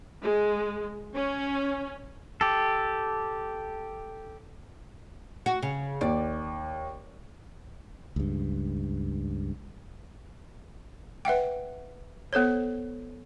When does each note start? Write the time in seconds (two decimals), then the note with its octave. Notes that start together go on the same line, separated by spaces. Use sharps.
0.23 G#3
1.13 C#4
2.41 G4 A4
5.46 F#4
5.62 C#3
6.01 D#2 D5
8.16 C#2 G2
11.25 B4 E5 F#5 G5
12.33 B3 A4 C5 C#5